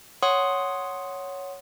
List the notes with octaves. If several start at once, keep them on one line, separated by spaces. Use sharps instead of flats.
C#5 F#5 C6 D#6